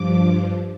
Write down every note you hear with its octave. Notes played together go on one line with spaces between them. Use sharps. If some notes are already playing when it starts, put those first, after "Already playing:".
Already playing: G2 F3 D6